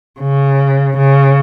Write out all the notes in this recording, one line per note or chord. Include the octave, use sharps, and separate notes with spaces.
C#3
C#3